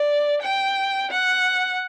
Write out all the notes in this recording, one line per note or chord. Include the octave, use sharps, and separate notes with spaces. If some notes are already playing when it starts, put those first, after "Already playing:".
Already playing: D5
G5
F#5